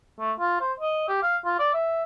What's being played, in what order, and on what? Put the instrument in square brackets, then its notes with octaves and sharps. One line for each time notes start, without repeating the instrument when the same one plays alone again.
[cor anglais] A3
F4
C5
D#5
G4
F5
F4
D5
E5